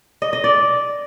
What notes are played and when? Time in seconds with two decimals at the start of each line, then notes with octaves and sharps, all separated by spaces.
0.22 D#5
0.33 D#5
0.44 D5